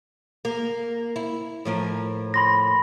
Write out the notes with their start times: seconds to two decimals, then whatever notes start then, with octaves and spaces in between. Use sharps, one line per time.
0.45 A#3
1.16 E4
1.65 A2 F3 A#4
2.34 B5 C6 A#6